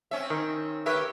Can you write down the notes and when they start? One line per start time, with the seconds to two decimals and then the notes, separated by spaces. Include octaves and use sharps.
0.11 C4 C#4 E5
0.30 D#3
0.86 G4 A#4 B4 C#5 E5